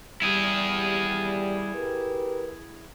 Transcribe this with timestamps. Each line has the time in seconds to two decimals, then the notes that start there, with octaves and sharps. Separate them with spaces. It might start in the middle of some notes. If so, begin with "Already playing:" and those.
0.22 G3 E4 G#4
1.75 G4 A#4 B4